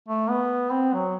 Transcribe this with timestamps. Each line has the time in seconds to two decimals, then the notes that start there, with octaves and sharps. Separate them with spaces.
0.08 A3
0.30 B3
0.72 C4
0.94 F#3